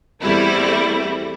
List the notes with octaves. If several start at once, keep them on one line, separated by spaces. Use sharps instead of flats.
E2 G3 A3 C4 E4